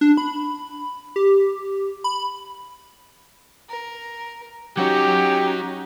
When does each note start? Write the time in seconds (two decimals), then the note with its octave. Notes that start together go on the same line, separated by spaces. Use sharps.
0.01 D4
0.17 B5
1.16 G4
2.04 B5
3.69 A#4
4.77 F#3 C#4 D#4 F#4 G4